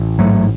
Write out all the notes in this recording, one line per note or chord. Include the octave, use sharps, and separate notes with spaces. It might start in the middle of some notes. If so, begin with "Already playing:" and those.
Already playing: A1
G#2 F#3 A3